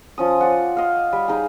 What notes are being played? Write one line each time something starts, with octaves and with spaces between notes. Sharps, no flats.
F3 C#4 D#6
F4 D5 F#5
D#5 F5
G3
D#4 G#4